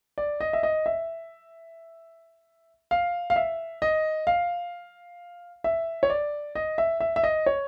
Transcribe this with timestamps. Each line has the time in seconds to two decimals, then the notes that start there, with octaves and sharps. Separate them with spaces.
0.18 D5
0.40 D#5
0.53 E5
0.63 D#5
0.86 E5
2.91 F5
3.30 F5
3.36 E5
3.82 D#5
4.27 F5
5.64 E5
6.03 C#5
6.10 D5
6.55 D#5
6.78 E5
7.00 E5
7.16 E5
7.24 D#5
7.46 C#5